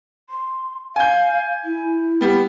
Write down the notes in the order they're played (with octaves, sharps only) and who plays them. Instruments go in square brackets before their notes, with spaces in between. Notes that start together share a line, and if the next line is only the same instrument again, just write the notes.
[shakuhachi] C6
[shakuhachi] F5 [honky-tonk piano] G#5 G6
[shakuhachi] E4
[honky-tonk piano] G3 B3